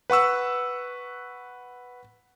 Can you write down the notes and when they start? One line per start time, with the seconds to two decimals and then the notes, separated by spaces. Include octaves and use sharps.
0.10 B4 F#5 C#6 E6